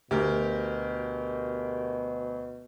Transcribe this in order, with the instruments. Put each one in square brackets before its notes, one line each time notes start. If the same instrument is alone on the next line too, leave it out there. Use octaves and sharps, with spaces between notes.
[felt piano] D2 [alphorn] B2 [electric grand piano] G4 A#4